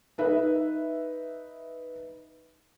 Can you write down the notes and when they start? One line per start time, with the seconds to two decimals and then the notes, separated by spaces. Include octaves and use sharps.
0.18 D#4 B4 E5